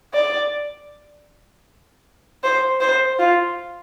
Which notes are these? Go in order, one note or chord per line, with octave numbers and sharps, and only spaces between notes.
D5
C5
C5
F4